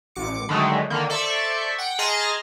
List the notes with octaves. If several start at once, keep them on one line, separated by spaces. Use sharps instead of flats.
A1 D6 C#7
D3 D#3 F#3 G#3 A3
D3 D#3 A#3
A4 C5 D5 E5 C#6
F#5 G5
G#4 D#5 A5 A#5 C6 F6